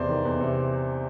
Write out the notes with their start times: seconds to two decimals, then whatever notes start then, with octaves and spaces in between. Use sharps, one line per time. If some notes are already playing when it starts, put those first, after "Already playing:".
Already playing: E2 C3 C5 D5
0.09 D#3
0.25 E2
0.40 C3